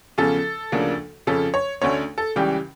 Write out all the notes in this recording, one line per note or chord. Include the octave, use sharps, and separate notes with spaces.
E2 C#3 F3 C#4 A4
D2 C#3 F3 A#3 D4
F2 C#3 F3 C#4 A4
C#5
D2 D3 A3 C#4 C#5
A4
C#2 C#3 E3 G3 C#4 G4